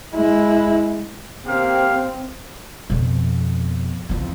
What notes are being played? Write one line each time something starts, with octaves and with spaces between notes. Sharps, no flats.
G#3 E4
A#3 C4 G4 F5
F2 B2
F2 E3